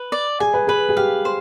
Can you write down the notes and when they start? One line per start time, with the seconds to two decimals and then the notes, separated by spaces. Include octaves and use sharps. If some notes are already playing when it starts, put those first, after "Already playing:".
Already playing: B4
0.12 D5
0.40 G#4 G#5
0.54 B4
0.67 G#4 B4
0.89 G#4
0.97 G4 F5
1.25 C5